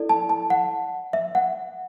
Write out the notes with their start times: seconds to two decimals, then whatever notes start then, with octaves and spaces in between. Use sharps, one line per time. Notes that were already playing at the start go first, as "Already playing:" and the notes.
Already playing: E4 A4 D5
0.09 A5
0.29 A5
0.50 F#5
1.13 E5
1.35 F#5